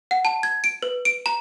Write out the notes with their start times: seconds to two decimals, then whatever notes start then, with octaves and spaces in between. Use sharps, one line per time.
0.11 F#5
0.25 A5
0.43 G#6
0.64 D7
0.83 B4
1.05 D7
1.26 A#5